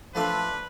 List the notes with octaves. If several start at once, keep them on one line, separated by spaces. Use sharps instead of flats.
F3 A3 D4 F4 A4 B4